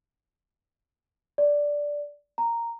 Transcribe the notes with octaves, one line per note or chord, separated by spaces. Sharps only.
D5
A#5